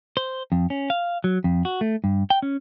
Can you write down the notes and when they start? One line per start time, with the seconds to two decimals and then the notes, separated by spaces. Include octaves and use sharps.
0.17 C5
0.52 F2
0.70 C#4
0.90 F5
1.24 F#3
1.44 F2
1.65 F#4
1.81 A3
2.04 G2
2.30 G5
2.42 C#4